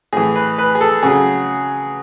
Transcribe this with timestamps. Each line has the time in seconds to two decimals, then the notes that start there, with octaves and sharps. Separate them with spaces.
0.13 A2 E3 G#4
0.36 B4
0.59 B4
0.75 G#4
0.81 A4
1.03 C#3 F#3 G#4